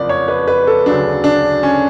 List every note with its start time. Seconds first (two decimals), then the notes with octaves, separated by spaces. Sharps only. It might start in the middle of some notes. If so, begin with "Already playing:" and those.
Already playing: F#1 F2 F3 D5
0.09 C#5
0.28 B4
0.48 B4
0.67 A4
0.86 D2 C#3 F#3 D4
1.24 D4
1.63 C#4